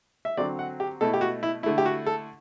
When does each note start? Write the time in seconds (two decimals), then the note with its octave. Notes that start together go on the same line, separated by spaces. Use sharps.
0.25 E5
0.37 D3 F#3 C4 D5
0.59 F#5
0.80 G4
1.01 B2 A3 E4 A4
1.14 G4
1.21 F#4
1.43 E4
1.63 D3 A3 E4
1.78 G4
1.85 F#4
2.06 A4